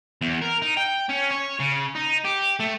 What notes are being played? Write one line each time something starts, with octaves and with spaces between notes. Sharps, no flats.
E2
A#4
D#4
G5
C#4
C#5
C#3
D#4
G4
A3